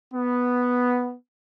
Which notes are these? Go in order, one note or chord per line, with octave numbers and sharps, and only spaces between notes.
B3